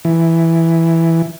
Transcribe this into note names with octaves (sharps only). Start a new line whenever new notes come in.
E3